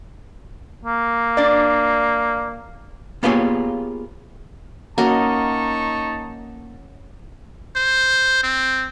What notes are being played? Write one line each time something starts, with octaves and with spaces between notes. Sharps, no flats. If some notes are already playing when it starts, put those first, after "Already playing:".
A#3
D4 D5
A#3 B3 F4 G4 G#4 C#5
A#3 C#4 D#4 F#4 D#5 A5 C#6
C5
C4